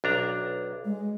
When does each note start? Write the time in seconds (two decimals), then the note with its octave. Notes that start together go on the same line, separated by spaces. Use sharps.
0.04 B1 D4 A#5
0.85 G#3